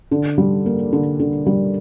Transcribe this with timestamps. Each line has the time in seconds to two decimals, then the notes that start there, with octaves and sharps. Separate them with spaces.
0.11 D3
0.38 G3
0.66 A#3
0.93 D3
1.20 D3
1.46 G3